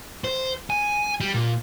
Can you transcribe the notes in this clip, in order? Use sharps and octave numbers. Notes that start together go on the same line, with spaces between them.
C5
G#5
G3
A#2